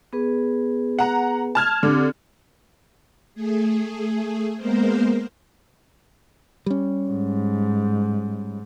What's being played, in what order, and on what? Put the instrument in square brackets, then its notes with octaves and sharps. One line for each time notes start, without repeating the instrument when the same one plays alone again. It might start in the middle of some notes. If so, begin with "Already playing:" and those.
[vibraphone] B3 G#4 B4
[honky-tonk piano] F#5 A#5
A5 F6 G#6
[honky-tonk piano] D3 [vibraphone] C4 G4 D6
[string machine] A3 G#4
G#3 A#3 B3 A#4 C5
[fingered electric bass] G3 C#4
[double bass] G#2